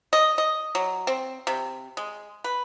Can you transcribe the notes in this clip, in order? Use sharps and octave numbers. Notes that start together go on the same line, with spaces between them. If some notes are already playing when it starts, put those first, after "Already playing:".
D#5
D#5
F#3
C4
C3
G#3
B4